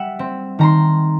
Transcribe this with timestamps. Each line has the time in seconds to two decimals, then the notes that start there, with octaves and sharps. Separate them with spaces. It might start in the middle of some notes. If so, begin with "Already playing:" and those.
Already playing: G3 E5 F#5
0.19 C4
0.59 D#3 A#5 C6